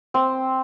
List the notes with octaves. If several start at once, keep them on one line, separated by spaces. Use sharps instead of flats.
C4